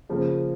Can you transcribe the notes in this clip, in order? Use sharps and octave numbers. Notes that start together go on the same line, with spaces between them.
C#3 F3 A#3